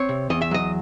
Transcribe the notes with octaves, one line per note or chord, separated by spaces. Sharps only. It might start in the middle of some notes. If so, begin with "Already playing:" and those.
Already playing: C4 C#5
C3
E2 D#5
E5
F#3 D#5